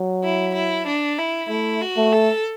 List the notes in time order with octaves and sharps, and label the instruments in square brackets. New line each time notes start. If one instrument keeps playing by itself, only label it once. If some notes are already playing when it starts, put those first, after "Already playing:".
Already playing: [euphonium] F#3
[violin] E4
E4
D4
E4
[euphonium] A3 [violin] E4
[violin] F#4
[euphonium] A3
[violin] A4